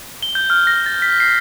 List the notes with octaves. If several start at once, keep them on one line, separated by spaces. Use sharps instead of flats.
G7
G6
F6
A#6
A6
B6
C7